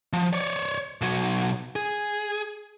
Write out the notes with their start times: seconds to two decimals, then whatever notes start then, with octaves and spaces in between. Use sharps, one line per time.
0.13 F3
0.33 C#5 D5
1.01 B1 F#3
1.76 G#4